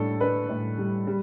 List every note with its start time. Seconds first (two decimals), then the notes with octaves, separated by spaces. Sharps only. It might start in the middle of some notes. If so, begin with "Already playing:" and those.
Already playing: A2 G3 D4 A4
0.20 D4 B4
0.49 A2
0.78 G3
1.07 G3